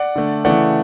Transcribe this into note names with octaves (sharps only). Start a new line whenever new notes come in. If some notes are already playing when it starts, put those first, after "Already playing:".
Already playing: D5 F#5
D3 A3
C#3 E3 A3 D5 F#5